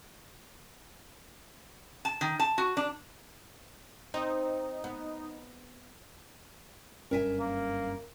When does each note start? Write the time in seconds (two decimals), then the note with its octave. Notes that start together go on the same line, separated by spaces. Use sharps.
2.05 A5
2.21 D#3
2.40 A5
2.58 F#4
2.77 D4
4.14 C4 D#4
4.84 B3
7.11 F#1 G2 C#4 A#4 E5 G#5
7.39 A#3